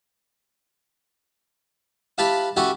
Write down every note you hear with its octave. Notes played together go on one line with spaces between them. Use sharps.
E4 F4 G4 B4 A5 B5
C#4 E4 F#4 G4 A4